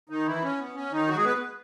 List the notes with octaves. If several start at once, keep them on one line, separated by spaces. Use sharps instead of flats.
D#3 D#4
E3 E4
C#4
B3
C#4
D#3 D#4
F#3 F#4
G#3 G#4
B3 B4